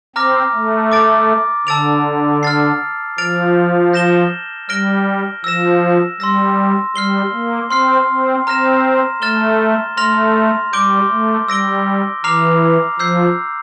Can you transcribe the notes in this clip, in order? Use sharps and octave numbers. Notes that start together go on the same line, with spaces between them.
C4 A#5 D6 F6 A#6
A3
D6 A6 D7
D3 A5 E6 A6 D7 F7
F6 A6 C7
F3 F6 A6 D7 F7
G6 A#6 E7 G7
G3 F6 A#6 D7 G7
F3 E6 A#6 E7
G3 C6 E6 A#6
G3 F6 C7 G7
A#3
C4 C6 F6 C7
C4
C4 A#5 F6 A#6 E7
A3 F6 A6 E7 G7
A3 C6 F6 A#6 F7
G3 D6 G6 D7 G7
A3
G3 E6 A#6 D7 G7
E3 A#5 D6 F6 C7 F7
F3 E6 G6 C7